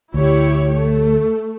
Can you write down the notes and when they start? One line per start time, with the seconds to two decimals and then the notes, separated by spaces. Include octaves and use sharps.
0.14 D2 E4 G4 C#5
0.73 A3